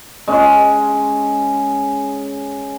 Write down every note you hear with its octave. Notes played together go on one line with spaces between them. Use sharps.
G#3 C#4